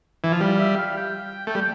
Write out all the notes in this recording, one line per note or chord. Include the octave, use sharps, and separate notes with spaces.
E3
F3
G3 F5
E5
F5
G5
A3
G3